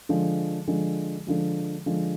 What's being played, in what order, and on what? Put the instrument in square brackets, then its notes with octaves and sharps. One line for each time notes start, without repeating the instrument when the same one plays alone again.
[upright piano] D3 F3 G#3
D3 F3 G#3
D3 F3 G#3
D3 F3 G#3